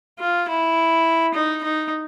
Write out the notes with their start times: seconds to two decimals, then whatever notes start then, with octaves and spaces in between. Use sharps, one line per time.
0.19 F4
0.48 E4
1.34 D#4
1.64 D#4